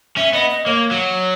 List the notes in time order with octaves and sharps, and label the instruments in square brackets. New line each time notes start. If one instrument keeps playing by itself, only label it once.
[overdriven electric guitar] C#4 [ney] E5
[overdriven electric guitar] B3 [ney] D#5
[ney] D#5
[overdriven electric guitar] A#3 [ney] C#5
[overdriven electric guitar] F#3